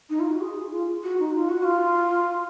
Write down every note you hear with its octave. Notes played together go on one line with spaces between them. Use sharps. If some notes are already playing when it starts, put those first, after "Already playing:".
D#4
F4
F#4
G#4
F4
F#4
D#4
F4
F#4
F4